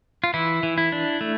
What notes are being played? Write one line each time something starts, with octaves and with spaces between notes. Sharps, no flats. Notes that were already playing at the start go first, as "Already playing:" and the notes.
F4
E3 E4
E3
E4
D4
A3